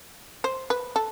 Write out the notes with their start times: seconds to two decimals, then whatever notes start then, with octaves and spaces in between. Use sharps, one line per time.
0.44 C5
0.70 B4
0.96 A4